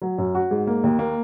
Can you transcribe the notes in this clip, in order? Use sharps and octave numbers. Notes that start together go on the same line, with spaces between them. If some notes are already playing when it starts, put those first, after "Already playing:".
F#3
F#2
F#4
G#2
A#3
D#2
A#3